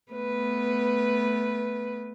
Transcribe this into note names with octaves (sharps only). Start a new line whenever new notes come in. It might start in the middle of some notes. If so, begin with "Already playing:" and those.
A3 B3 B4